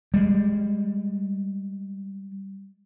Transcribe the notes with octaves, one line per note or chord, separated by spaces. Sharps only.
G3 G#3